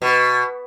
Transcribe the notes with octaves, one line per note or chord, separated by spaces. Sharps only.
B2